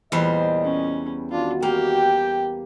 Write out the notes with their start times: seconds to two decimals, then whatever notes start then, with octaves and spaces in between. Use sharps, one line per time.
0.12 E2 A#2 G3 C5 D#5
0.64 C#4
1.32 D#3 D4 F4 F#4
1.62 A#3 G4 G5